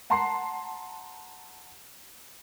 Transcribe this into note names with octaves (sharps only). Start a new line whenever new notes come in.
F#5 A5 A#5 C6 C7